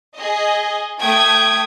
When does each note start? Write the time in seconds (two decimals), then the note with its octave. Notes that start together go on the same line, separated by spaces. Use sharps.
0.17 G#4 D#5
1.00 A3 G5 D#6 G#6